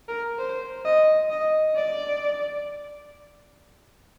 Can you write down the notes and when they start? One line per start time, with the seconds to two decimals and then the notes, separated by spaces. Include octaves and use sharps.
0.08 A#4
0.39 C5
0.85 D#5
1.30 D#5
1.76 D5